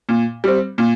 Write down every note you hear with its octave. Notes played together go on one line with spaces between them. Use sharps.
A#2
G3 C4
A#2